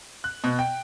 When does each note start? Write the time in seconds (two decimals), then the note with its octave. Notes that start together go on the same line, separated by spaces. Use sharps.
0.24 F#6
0.44 B2
0.59 G5